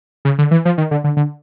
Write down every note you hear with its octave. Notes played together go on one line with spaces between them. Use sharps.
C#3
D3
E3
F3
D#3
D3
D3
D3